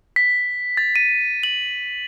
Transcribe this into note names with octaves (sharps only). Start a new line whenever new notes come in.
B6
A6
D#7
F#7